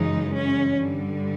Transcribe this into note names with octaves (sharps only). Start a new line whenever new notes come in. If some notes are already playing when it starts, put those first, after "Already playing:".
Already playing: F#2 C#3 E3 G#3 D#4
C#4
G2 D3 G3